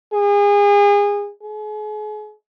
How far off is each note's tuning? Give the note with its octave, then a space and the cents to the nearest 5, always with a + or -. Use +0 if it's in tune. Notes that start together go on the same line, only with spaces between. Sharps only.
G#4 -30
G#4 +40